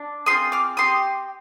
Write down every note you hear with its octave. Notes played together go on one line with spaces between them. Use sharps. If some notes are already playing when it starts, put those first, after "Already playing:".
Already playing: D4
C4 F4 G#4 C6 D#6
D6 F6
C4 G4 C6 D#6